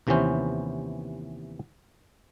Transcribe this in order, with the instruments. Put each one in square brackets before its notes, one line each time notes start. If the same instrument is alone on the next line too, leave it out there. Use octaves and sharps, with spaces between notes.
[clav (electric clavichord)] D#2 C3 E3 B3 C#4 C5